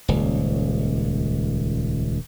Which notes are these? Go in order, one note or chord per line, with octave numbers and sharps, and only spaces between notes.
D#1 C#2